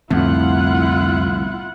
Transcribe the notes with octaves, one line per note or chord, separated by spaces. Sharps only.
C2 F2 A2 D3 B3 E4 F4 F#5